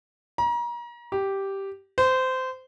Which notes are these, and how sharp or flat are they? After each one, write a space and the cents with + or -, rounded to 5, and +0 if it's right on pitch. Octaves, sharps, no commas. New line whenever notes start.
A#5 +35
G4 -5
C5 -20